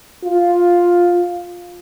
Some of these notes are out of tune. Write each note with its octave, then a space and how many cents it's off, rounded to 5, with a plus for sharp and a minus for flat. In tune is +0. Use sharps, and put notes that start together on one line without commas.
F4 +10